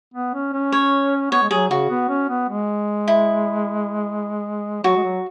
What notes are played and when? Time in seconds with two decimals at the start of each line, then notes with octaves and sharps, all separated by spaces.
0.14 B3
0.34 C#4
0.53 C#4
0.72 C#5
1.31 B3 C#5
1.42 G#3
1.50 F#3 G#4
1.70 C#3 F#4
1.90 B3
2.09 C#4
2.29 B3
2.49 G#3
3.08 E4
4.83 F#3 F#4
4.97 G#3
5.04 F#3